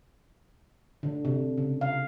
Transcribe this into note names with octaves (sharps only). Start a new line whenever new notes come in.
D3
C3
C#3
F5